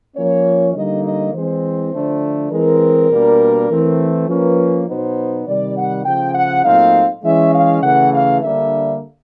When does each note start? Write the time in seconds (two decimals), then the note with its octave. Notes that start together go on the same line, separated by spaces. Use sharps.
0.15 F3 A#3 C#4 C#5
0.74 D3 G3 A#3 D#4 D#5
1.04 D#5
1.33 E3 G#3 C4 C5
1.92 D3 F3 A3 D4
2.51 E3 G#3 C4 A#4
3.10 B2 G3 A#3 D4
3.70 E3 A3 C4
4.28 F3 A#3 C#4 B4
4.87 B2 F#3 B3 D#4 C5
5.46 C3 D#3 G3 D5
5.76 F#5
6.05 C#3 F3 A3 G5
6.34 F#5
6.64 A#2 F#3 A3 C4 D#4 F5
7.24 E3 G#3 C#4 E5
7.54 F5
7.82 C#3 E3 A3 F#5
8.13 F5
8.41 D3 G3 A#3 D4 E5